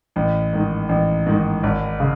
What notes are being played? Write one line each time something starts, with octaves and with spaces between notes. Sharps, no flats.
A1
G#2 D#3
A1
G#2 D#3
G#1
C#3